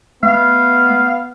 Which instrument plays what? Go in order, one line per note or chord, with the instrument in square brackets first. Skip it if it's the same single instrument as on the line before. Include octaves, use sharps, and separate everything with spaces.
[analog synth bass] A3 [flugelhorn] B3 [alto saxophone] F5